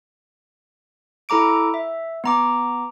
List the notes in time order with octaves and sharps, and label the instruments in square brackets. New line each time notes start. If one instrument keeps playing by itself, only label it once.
[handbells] E4 A4 A#5 D6 D7
E5
B3 A#5 D6